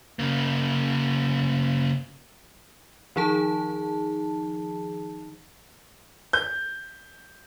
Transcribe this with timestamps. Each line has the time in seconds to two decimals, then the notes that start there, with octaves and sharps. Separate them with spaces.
0.19 C#3 A#3
3.16 D#3 F3 D#4 G#4 A5
6.33 G6